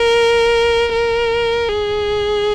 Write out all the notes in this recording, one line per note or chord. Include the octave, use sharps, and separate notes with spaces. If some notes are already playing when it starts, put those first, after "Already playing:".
Already playing: A#4
A#4
G#4